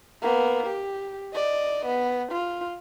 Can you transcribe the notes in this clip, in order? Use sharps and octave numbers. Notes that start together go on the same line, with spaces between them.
A#3 B3
G4
D5 D#5
B3
F4